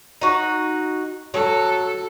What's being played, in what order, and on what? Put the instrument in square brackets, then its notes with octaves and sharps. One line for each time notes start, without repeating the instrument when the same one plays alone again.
[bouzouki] D#4 F#4
[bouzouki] F#3 [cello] A4